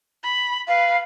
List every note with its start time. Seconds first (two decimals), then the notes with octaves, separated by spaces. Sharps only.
0.23 B5
0.68 B4 F5